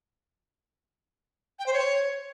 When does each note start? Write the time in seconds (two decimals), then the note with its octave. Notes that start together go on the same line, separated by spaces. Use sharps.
1.59 G5
1.66 C5
1.73 C#5